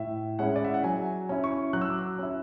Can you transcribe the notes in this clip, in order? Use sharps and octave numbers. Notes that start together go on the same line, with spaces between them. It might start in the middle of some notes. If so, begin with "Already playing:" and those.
Already playing: A2 E5
G#3 C#4 E4 F#5
D5
E5
F#5
F#3 G#5
C#4 E4
C#6
F#3 F#6
E6
D6
E6
C#4 E4